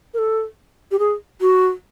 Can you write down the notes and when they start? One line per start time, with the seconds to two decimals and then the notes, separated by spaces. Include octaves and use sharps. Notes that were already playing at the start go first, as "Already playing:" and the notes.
0.14 A#4
0.18 A4
0.91 G4
0.99 G#4
1.41 F#4